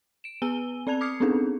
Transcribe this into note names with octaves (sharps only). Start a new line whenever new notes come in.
D7 E7
B3 B4 G#5 E6 D#7 G7
C4 D5 A5 G#6 F7
D6 D#6 F6 G#6 C7 C#7
B3 C4 D4 D#4 G#4 A4